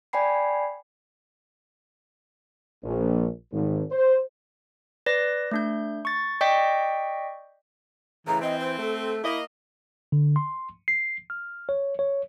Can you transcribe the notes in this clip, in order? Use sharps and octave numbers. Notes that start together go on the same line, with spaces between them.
D5 G5 G#5 B5 C7
A#1
G#1
C5
B4 D5 A#6
A3 D4 G6
C#6 A6
D5 D#5 G5 C#6 G6 B6
A2 C#3 E3 A#5
C4 D#5
C5
A3 A4
A#3 E4 D#5
D3
C6
C7
F6
C#5
C#5